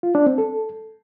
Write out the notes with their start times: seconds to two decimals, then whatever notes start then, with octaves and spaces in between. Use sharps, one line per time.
0.03 F4
0.15 D4
0.26 C4
0.38 A4